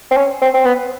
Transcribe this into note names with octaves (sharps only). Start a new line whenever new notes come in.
C4
C#4
C4
C4
B3